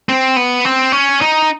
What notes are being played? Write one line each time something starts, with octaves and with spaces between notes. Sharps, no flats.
C4
B3
C4
C#4
D#4